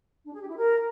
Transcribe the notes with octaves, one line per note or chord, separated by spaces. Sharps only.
D4
G#4
G4
E4
A#4